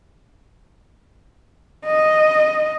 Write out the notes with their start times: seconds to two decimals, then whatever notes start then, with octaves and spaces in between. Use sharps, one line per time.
1.86 D#5